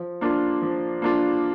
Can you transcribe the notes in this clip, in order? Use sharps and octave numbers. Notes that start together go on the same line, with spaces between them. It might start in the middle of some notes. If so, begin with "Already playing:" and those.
Already playing: F3
A#3 D4 F4
F3
A#3 D4 F4